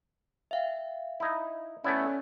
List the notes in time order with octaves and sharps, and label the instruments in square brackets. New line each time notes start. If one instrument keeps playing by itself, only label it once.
[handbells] E5 F5 G5
[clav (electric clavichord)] D#4 E4
[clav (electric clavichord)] A3 B3 E4 [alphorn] C#4 [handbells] D5